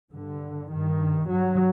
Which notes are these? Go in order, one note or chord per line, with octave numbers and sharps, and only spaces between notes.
G2 D3
G2 D#3
G2 F#3